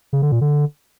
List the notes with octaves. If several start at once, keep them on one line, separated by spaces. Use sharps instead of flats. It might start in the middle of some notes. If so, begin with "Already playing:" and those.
C#3
D3
A#2
D3